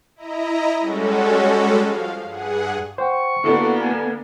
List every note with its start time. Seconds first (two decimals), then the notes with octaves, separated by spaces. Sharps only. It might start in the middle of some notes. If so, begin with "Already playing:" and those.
0.16 E4 D#5 A#5
0.80 G3 G#3 C#4 F#4 A4
1.83 F3 F5
2.24 G2 G#4 F#5
2.98 C5 F#5 G5 C#6
3.44 D3 A#3 B3 E4 F#4 G4 A4 D5
3.80 G#5